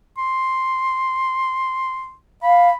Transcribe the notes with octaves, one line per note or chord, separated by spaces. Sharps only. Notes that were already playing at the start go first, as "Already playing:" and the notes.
C6
F5 B5